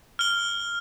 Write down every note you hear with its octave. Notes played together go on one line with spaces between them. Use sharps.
F6 G7